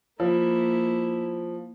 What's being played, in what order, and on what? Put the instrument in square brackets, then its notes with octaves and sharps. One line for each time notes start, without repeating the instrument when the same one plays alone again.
[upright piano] F3 [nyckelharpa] A#3 E4